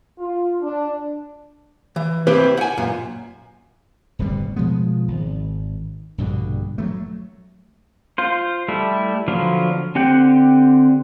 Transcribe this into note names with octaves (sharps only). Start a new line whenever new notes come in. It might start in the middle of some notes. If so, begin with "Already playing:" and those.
F4
D4
E3
C4 E4 G4 B4 C5
F#5 G#5
F#2 A#2
D1 G1 B2 G3
B2 F3 G#3 B3
G#1
A#1 G2 B2 D3
F#3 G3 A3
F4 C5
G3 A3 E4
D3 F3 F#3 B3 F4
D3 C4 G4 F#5 G5